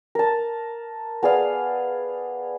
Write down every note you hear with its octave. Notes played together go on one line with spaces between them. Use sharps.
A#4 A5
B3 G#4 D5 F5